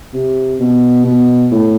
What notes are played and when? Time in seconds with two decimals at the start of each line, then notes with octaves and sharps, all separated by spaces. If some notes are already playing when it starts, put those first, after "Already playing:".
0.13 C3
0.60 B2
1.04 B2
1.51 A2